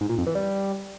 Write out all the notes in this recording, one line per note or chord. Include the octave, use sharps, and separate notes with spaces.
G#2
A#2
F2
E3
G3